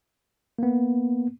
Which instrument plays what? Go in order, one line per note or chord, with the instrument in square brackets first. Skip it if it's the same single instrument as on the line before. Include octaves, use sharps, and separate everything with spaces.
[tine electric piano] A#3 B3